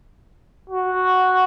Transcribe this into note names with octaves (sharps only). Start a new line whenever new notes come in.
F#4